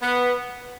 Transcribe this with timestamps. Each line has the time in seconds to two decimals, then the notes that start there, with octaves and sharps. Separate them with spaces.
0.01 B3